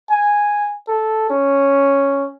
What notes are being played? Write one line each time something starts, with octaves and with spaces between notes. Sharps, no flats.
G#5
A4
C#4